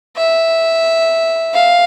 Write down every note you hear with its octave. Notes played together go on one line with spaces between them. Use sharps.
E5
F5